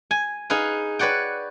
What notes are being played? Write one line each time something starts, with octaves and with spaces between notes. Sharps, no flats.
G#5
D#4 G#4 B4 F5
B4 C#5 D5 F#5 G5